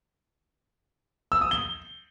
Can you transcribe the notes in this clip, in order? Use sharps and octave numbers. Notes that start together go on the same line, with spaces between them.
E6
D#6
G7